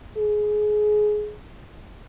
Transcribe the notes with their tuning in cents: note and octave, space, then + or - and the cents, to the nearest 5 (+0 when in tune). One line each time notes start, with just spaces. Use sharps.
G#4 +20